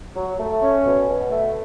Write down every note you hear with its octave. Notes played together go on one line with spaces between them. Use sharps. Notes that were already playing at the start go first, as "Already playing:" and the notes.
F#3
A3
C#4
B2
B2
A3